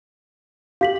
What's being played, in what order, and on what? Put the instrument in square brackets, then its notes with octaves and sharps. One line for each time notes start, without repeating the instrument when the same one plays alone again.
[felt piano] G4 [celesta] F5 B6 F#7